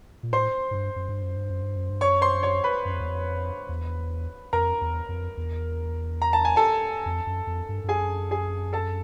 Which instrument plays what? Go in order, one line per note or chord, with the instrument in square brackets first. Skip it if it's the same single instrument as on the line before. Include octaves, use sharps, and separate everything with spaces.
[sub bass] A#2
[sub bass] A2 [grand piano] C5 C6
[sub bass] G#2
G2
F#2
G2
F#2
G2
F#2
G2
F#2
G2
[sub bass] F#2 [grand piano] C#5 C#6
[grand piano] C5 C6
C#5 C#6
B4 B5
[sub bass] F#2
F2
E2
F2
E2
[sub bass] F2 [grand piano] A#4 A#5
[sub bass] E2
F2
E2
[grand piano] A#5
A5
G#5
A4 A5
[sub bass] F2
F#2
F2
G2
G2
[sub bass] F#2 [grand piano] G#4 G#5
[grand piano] G#4 G#5
A4 A5